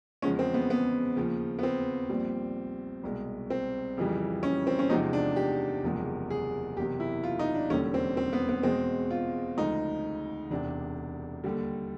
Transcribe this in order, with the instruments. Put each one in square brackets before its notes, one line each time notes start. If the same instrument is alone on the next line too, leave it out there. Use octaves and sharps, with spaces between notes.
[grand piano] E2 C#3 F3 G#3 C#4
C4
B3
B3
D#2 C#3 F3
B3
C4
A#1 A#2 G3
C2 B2 G#3
C4
F2 C#3 E3 G3
C#4
C4
C#4
E2 C3 F3 G#3 D#4
D4
G4
F#1 E2 C3 F3 G#3
G#4
F#1 E2 C3 G4
E4
F4
D#4
D4
E1 D#2 D3 G3 C#4
C4
C4
B3
B3
E2 B2 G#3 C4
F4
D2 C#3 F3 G#3 D#4
E1 E2 C3 D4
D#2 D3 G3